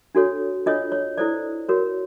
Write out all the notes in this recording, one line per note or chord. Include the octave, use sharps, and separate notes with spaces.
D4 F#4 A4 C#5
D4 F4 A4 C#5 D#5
C#5
E4 A4 C5 D5
F#4 A#4 C#5